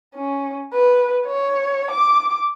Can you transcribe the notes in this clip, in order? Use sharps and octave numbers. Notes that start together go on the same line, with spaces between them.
C#4
B4
C#5
D6